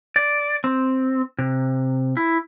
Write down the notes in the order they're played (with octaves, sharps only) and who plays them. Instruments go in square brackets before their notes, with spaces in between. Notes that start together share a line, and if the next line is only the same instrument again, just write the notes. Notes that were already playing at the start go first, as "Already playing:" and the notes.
[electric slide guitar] D5
C4
C3
E4